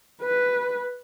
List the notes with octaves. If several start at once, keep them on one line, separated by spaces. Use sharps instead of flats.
B4